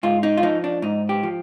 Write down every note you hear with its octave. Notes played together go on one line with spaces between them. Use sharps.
G#2 F4
D#4
F4
F3 D#4
D4
G#2 D#4
G4
F3